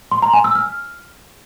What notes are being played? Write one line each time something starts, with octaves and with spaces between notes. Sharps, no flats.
C6
A#5
G#5
E6
F6